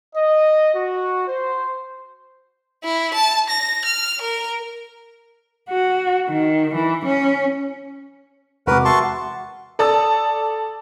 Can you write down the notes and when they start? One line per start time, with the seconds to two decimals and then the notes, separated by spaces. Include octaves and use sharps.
0.15 D#5
0.74 F#4
1.28 C5
2.84 E4
3.14 A5
3.49 A#6
3.85 F6
4.22 A#4
5.70 F#4
6.30 D#3
6.75 E3
7.06 C#4
8.67 E2 C3 G#3 F#4 A#4 B4 D6
8.85 E5 A5 C6 C#6
9.79 A4 D5 A5 D#6 E6